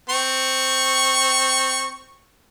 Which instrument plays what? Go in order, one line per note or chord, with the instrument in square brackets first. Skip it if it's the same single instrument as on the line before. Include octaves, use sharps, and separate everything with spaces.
[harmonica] C4 C#6